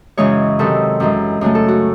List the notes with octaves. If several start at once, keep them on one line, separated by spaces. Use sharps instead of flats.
F#2 C#3 E3 G#3 C#5
C3 D#3 F#3 A4
F#2 E3 G#3
F#2 C#3 F#3 A3
A4
F#4